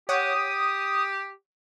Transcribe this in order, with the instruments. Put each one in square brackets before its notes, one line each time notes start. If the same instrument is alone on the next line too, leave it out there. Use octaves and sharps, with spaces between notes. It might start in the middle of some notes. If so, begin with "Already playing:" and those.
[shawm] G4 [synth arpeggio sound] C#5 F#5 [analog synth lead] D#6
[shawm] G4